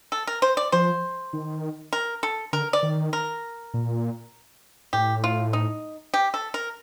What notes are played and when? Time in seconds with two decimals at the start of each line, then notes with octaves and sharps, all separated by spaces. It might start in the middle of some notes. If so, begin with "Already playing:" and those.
0.12 A4
0.27 A#4
0.42 C5
0.57 D5
0.72 F3 C5
1.33 D#3
1.93 A#4
2.23 A4
2.53 D3 A#4
2.73 D5
2.83 D#3
3.13 A#4
3.74 A#2
4.93 A2 G4
5.24 F4
5.53 D#4
6.14 G4
6.34 A4
6.54 A#4